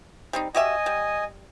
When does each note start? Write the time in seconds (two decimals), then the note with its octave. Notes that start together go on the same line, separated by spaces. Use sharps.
0.33 G3 C4 D#4
0.55 F#4 G4 D#5 E5 G#5
0.86 G3